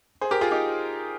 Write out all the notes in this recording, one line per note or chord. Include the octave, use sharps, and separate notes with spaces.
G#4 C5
G4 A#4
F4 G#4
D#4 G4